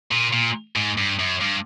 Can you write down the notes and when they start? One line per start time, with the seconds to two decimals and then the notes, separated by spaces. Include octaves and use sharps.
0.12 A#2
0.33 A#2
0.76 G#2
0.98 G2
1.19 F#2
1.41 G2